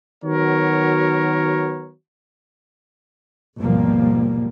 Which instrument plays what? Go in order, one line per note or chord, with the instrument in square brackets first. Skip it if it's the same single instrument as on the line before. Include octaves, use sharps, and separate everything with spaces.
[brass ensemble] D#3 F#3 B3 F#4 A#4 C#5
[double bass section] G#1 D#2 B2 F3 G3 A#3